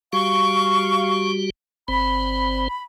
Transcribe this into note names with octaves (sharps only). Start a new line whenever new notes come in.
G3 F#4 G4 F5 C#6
G1 C4 C5 B5